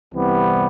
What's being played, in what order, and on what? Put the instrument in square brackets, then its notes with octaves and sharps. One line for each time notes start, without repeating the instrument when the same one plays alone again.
[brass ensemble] C2 C3 E3 G3 B3